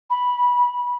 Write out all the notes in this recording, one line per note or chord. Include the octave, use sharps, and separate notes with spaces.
B5